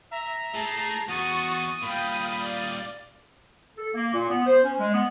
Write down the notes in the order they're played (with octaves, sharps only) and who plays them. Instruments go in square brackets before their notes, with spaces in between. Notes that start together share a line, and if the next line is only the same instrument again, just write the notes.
[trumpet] E5 [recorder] A#5
[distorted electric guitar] A2 A3 [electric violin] G#4 C7 [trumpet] A5
[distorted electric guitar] E2 [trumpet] F#4 [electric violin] C#6 A6 [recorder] D#6
[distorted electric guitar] A#2 G3 [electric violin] F5 G5 [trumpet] B5
[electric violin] D5 F5
[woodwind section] A4
A#3
A#2
B3
C5
C#4
G#3
B3